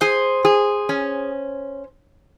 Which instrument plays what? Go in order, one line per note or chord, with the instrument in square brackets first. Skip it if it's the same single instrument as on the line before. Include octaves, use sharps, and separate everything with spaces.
[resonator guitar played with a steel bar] G#4 [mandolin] C5
[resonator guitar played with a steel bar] G#4
C#4